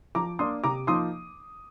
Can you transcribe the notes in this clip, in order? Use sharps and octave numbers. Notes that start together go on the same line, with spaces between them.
F3 A#5 D6
A#3 D4 C6 D#6
C3 A#5 D6
F3 A#3 D#4 C6 D#6